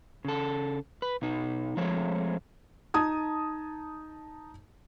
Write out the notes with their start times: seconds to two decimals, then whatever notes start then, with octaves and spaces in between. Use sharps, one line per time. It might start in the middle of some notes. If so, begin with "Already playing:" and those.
0.25 C#3 A4
1.02 B4
1.22 B2 D#4
1.77 F3 G#3 A3 C4 C#5
2.94 D#4 A5 D#6 G#6